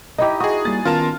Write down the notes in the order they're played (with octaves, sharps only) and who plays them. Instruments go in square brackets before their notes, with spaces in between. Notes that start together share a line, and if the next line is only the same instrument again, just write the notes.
[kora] D#4 E4 G4 [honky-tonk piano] D#5
[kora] F#4 [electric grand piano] G#4 D#6
[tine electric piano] G3 A#3 [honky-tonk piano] A6
[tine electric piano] D#3 B3 C#4 [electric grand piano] F4 A#4 A5 [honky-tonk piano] F6